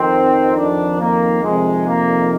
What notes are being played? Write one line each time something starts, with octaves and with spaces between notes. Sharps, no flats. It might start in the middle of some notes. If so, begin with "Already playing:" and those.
Already playing: F2 D#3 C4
D4
A#3
F2 C3 D#3 G#3
A#3